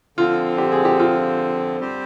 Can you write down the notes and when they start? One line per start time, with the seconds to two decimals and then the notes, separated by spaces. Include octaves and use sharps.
0.17 D3 F3 C4 F4
0.58 G4
0.72 G#4
0.85 G4
0.99 F4
1.80 G3 C4 G4 C5